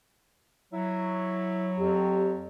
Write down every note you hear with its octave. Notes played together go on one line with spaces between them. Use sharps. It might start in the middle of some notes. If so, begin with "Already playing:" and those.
F#3 E4
F2 G4